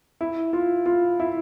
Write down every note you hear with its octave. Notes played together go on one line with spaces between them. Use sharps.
E4
F4
F4
E4